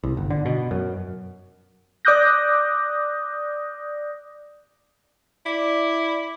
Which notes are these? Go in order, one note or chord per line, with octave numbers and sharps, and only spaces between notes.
C2
G1
D3
B2
F#2
D5 D6 D#6 F#6 G6 A#6
E4 D5 D6